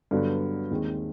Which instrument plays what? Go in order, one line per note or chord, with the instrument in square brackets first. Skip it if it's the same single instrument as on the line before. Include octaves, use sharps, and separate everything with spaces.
[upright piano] G2 D3 F#3 B3
D#2 D#3 G#3 C4